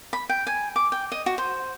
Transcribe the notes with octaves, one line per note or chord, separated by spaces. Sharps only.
B5
G5
G#5
D6
G5
D#5
F#4
C5